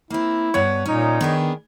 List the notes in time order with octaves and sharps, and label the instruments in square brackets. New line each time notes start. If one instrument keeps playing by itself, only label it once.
[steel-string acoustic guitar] A#3 C4 [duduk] E4
[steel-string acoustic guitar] G2 B3 [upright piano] C#5
[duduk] A#2 [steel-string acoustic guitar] C#4 [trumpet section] D#4
[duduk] D#3 [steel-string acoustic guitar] B3 D4 G#4